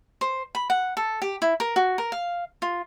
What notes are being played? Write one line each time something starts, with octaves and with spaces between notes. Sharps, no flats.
C5
B5
F#5
A4
G4
E4
A#4
F#4
A#4
F5
F4